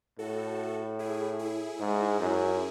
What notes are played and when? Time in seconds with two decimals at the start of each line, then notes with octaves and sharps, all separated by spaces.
0.19 A2 F#4 A4
0.99 E4 G#4
1.39 E4 G#4
1.80 G#2
2.20 F#2